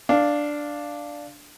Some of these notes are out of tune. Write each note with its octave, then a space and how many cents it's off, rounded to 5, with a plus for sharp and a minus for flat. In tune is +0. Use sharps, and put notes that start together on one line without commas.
D4 +0 F5 +0